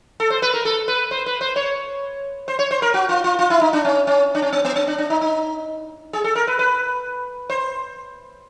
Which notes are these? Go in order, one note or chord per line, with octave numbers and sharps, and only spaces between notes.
A4
C5
B4
A#4
A4
B4
C5
B4
C5
C#5
C5
C#5
C5
A#4
F#4
F4
F4
F4
E4
D#4
D4
C#4
C#4
D4
C#4
C4
B3
C4
D4
D4
D#4
D#4
G#4
A4
A#4
B4
B4
C5